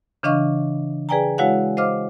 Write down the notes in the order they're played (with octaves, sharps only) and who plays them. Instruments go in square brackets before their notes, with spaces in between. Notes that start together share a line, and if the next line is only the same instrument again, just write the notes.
[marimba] C#3 E3 D4 D#5 F5 C#6
G#4 B4 D5 G5 G#5 A#5
G#3 E4 F#4 C#5 F5 F#5
C5 D#5 F5 D6 F6